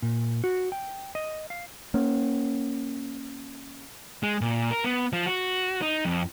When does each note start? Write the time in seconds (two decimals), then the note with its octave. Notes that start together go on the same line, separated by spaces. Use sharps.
0.02 A#2
0.44 F#4
0.72 G5
1.15 D#5
1.50 F5
1.94 A#3 C#4
4.23 G#3
4.41 A#2
4.71 A#4
4.84 B3
5.13 F3
5.26 F#4
5.82 D#4
6.05 F2